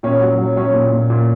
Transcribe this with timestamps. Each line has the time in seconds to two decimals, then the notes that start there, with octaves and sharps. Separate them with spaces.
0.03 A#2 C#4
0.21 F#3
0.38 F#3
0.56 F#3 C#4
0.74 A#2
0.92 A#2
1.10 A#2